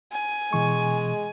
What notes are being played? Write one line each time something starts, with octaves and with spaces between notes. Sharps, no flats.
G#5
B2 E3 G#3 C#6